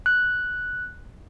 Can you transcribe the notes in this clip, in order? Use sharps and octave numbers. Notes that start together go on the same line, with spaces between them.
F#6